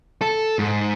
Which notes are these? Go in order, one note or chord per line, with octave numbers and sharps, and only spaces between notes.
A4
G#2